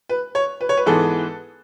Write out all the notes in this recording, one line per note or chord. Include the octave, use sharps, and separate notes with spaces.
B4
C#5
B4
C#5
B4
G#2 E3 G#3 B3 A4